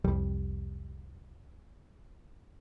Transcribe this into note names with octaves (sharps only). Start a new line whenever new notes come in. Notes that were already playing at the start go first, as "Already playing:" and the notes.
C2 F2 G3